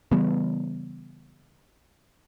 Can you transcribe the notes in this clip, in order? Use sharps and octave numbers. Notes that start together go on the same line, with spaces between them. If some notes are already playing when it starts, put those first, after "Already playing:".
C#3 E3 G3 B3